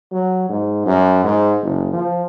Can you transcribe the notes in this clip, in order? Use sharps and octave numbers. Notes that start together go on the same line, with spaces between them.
F#3
G#2
F#2
G#2
F#1
F3